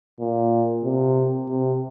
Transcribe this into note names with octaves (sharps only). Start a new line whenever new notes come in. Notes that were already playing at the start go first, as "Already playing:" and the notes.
A#2
C3
C3